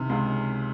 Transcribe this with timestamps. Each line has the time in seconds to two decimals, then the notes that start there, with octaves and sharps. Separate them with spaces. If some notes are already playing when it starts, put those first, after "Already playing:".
Already playing: C3 D#3 F6
0.10 C#2